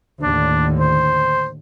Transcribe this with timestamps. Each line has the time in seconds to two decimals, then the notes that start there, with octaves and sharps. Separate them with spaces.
0.22 D#2 A2 D3 D4
0.80 C5